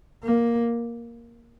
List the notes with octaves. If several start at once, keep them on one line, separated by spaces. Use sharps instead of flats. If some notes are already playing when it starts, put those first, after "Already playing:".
A#3